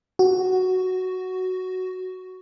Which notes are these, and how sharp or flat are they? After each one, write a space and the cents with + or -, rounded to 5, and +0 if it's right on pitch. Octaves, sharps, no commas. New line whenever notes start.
F#4 +5